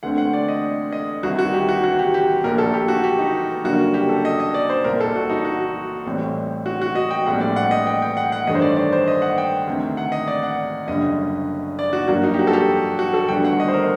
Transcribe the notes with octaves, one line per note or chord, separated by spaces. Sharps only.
D2 D3 A3 C4 F#5
F#5
D5
D#5
D#5
C2 C3 D#3 F#4
F#4
G4
F#4
F#4
G4
G4
A#1 A#2 A3 A#4
A4
G4
F#4
G4
D#4
F#1 F#2 D3 G3 A#3 F#4
G4
A4
D#5
D#5
D5
C5
C2 A#2 G3 A#4
A4
F#4
D#4
F#4
A1 A2 G3 C4
F#4
F#4
D#5
G5
A#1 A2 G3 C4 F#5
D5
F#5
D#5
G5
G5
F#5
F#5
A1 G2 D#3 A3 D#5
C5
D5
D5
C5
D#5
F#5
G5
D2 C3 D#3
F#5
D#5
D5
F#5
F#1 F#2 D3 G3 D#5
D5
F#4
G2 F#3 A#3 F#4
D#4
G4
F#4
A4
G4
F#4
A4
G1 G2 D#3 A3 G5
F#5
D#5
C5
A#4